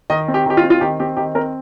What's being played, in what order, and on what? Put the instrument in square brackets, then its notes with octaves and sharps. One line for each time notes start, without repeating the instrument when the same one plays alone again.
[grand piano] D#3 D#5
C4
G4
D#3 G4
F4
C4
F4
D#3 G4
C4 G4
D#3 G4
C4 A#4